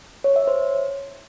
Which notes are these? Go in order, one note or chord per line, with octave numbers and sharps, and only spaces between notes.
C#5
E5
C5